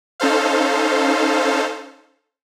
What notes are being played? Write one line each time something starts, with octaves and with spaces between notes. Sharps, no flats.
C#4 D#4 A4 C5 F5